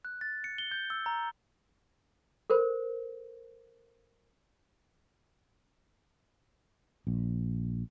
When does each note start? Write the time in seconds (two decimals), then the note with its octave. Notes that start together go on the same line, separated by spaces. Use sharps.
0.05 F#6
0.21 A6
0.44 C#7
0.58 G7
0.71 G6
0.90 E6
1.06 A#5
2.50 A4 A#4 C5
7.07 A#1